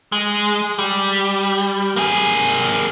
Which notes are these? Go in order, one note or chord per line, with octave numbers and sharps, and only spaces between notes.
G#3
G3
A#3 G#4